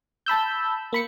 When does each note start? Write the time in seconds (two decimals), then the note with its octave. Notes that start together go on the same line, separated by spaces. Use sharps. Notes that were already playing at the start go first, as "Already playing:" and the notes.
0.26 A5 B5 E6 G6
0.93 A#3 B5 C#7